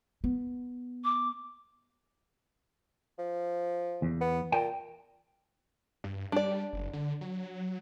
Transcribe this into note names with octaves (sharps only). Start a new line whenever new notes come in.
B3
D6
F3
E2
B3
A#2 G5
G2
G3 D4 D5
F#1
D3
F#3